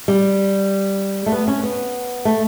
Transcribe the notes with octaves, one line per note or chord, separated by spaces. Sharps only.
G3
A3
B3
C#4
B3
A3